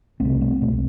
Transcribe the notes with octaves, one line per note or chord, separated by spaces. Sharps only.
C2 C3 A3 C4
A3 C4
C2 B2